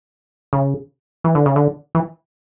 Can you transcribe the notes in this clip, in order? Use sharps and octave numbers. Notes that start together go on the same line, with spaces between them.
C#3
E3
D3
C#3
D3
E3